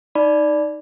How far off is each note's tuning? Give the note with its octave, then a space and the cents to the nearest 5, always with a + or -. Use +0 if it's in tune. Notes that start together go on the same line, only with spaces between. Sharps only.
D#4 +0 D5 +0 B5 +0